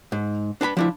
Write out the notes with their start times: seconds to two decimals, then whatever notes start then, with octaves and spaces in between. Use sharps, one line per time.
0.12 G#2
0.61 D4 B4 A5 B5
0.77 F3 D4 E4